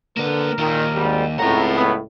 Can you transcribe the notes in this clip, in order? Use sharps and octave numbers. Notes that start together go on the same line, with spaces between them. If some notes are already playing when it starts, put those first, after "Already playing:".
D3 A#3 A#4 B4
D#2 A#2 D#3
G#1 G#2 G3
C#2 A2 C4 F#5 A#5
B3